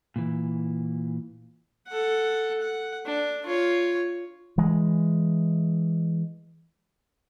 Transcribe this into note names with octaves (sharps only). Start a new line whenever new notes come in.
A#2 E3
A4 F#5
F#5
D4
F4 C#5
E3 G#3